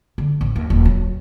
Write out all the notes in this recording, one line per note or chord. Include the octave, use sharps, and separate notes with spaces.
D3
A1
D#2
D#1
F#3